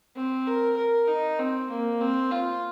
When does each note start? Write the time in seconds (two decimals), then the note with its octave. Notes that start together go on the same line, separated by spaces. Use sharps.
0.16 C4
0.47 A#4
0.77 A#4
1.07 D#4
1.39 C4
1.70 A#3
2.01 C4
2.31 F4